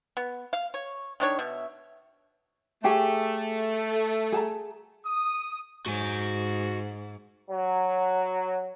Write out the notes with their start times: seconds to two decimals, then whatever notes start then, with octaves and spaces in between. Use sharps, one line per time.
0.17 B3
0.53 F5
0.74 C#5
1.20 D#3 D4 C#5
1.39 B2 E5
2.84 A3 G4 G#4 C#5
4.32 G#4 A5 A#5
5.05 D#6
5.86 G#2 F#4 G#5
7.50 F#3